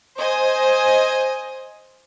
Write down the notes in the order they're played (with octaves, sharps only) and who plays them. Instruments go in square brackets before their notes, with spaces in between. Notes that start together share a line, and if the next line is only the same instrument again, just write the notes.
[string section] C5 D#5 G#5